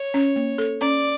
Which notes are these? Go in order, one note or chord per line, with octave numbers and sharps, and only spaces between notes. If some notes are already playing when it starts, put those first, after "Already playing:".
Already playing: C#5
C#4
A#3
A4
C#4 D5